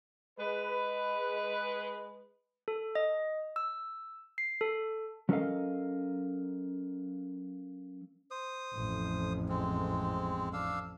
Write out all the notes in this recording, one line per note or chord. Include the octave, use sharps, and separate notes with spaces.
G#3 B4
A4
D#5
E6
C7
A4
F#3 C#4 A4 A#4 D#5 F5
C5 D#6
A1 F2
G#3 C4
D4 F5 E6